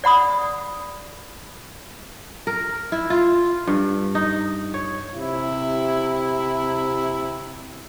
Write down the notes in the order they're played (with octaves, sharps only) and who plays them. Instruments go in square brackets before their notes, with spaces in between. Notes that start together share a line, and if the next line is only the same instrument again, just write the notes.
[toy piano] D5 F#5 B5 D#6
[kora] A#4
E4
F4
G2
D#4
C#5
[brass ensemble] C3 E4